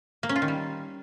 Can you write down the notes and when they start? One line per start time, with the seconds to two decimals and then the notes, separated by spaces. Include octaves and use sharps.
0.23 A#3
0.29 C#4
0.36 F4
0.42 D#3
0.48 G3